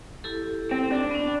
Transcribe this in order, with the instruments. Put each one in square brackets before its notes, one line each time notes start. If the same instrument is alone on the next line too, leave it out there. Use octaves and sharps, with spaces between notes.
[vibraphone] E4 G4 A4
[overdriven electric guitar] C4
D4
[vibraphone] B3 C#4